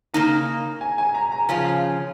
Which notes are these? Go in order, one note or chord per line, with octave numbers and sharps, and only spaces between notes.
C#3 A#3 D#4 A#5
G#5
G#5
A#5
A#5
C#3 F3 C#4 F4 G#5